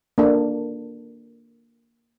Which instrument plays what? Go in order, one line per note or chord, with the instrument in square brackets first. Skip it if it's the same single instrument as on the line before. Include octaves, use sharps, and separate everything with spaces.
[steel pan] A#3 D4 A4